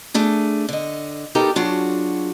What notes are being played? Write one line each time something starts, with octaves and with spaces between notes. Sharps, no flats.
A3 D4 G#4
D3 D#5
B3 D#4 G4 A4 A#4
F#3 D4 F4 F#4 G#4 A5